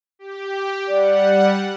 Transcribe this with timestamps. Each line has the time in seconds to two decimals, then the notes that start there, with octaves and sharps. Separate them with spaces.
0.19 G4
0.88 G3 D5 F#5